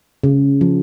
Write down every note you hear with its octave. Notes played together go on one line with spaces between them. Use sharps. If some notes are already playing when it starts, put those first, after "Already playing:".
C#3
F3